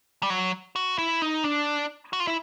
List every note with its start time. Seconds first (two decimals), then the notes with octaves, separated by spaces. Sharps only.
0.23 G3
0.30 F#3
0.76 F#4
0.98 E4
1.22 D#4
1.44 D4
2.13 F#4
2.20 F4
2.27 E4